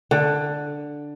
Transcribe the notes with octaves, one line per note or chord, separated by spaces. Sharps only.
D3